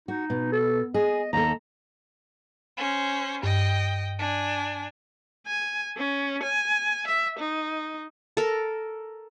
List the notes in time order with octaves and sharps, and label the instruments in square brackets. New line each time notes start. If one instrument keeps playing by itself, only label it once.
[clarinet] D#4 [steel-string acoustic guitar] F#4
[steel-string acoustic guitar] B2
[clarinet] A4
[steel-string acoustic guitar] G#4 [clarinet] D#5
[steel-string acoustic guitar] D#2 A4 [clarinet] A#5
[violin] C#4 C5
[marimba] G2 [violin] D#5 G5
[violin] D4 G#5
[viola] G#5
C#4
G#5
E5
D#4
[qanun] A4 A#4